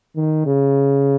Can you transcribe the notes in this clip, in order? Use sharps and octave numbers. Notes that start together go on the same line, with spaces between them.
D#3
C#3